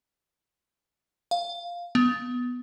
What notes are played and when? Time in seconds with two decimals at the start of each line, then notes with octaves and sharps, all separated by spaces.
1.31 F5
1.95 B3